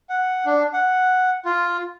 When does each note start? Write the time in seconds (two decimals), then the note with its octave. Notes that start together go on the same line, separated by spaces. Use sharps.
0.09 F#5
0.46 D4
0.73 F#5
1.45 F4